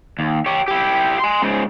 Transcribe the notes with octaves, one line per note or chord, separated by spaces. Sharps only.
D#2
G4 C#5
E4 G4
G#5 C6
G#2 C#3